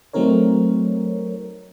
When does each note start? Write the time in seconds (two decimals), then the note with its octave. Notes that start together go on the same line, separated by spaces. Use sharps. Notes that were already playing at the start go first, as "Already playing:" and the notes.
0.13 F#3 A3 C4 D#4 A#4 C#5